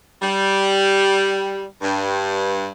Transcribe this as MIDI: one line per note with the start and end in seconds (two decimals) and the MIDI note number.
0.22 1.64 55
1.82 2.69 43